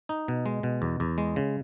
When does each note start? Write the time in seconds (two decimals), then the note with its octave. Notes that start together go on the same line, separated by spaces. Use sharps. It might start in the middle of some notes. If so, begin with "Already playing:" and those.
0.09 D#4
0.28 B2
0.46 G#3
0.63 B2
0.82 E2
1.00 E2
1.18 G#3
1.36 C#3